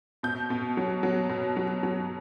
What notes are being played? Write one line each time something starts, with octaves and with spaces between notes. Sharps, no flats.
B2 G6
B2
F#3
F#3
B2
F#3
F#3